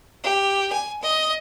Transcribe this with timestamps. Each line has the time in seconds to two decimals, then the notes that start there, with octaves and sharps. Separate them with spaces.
0.23 G4
0.73 G#5
1.02 D#5